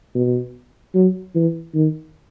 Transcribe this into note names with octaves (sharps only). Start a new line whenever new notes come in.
B2
F#3
E3
D#3